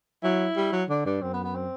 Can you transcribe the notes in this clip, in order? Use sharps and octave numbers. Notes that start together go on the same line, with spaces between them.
F#3 E4
G3
F#3
D3 D4
G2 D4
F#2 C4
B3
B3
C4